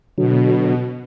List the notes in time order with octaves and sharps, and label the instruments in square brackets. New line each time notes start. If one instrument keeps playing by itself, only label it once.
[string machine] B2 [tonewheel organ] D3 F#3